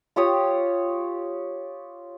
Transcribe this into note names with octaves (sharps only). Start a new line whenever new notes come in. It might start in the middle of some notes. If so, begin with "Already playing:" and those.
F4 G4 C#5 D#6